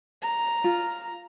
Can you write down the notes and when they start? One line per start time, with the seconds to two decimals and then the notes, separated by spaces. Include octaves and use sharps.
0.22 A#5
0.64 F4